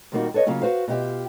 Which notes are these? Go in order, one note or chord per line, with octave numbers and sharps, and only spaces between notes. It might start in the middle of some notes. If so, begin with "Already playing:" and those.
A#2 D#3 G3 A#3 D#4 F#4
A4 B4 C#5 D#5
C#3 F#3 A#3 C#4 F4 G#4
F#4 B4 C5 F5
B2 F4 G4 E5